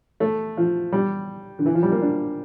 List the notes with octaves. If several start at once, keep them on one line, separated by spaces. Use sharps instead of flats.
A3
F3
G3
D3
E3
F3
G3
A#3
D4